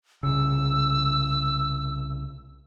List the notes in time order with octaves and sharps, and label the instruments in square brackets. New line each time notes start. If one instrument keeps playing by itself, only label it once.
[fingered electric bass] C2 C#3 [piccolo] E6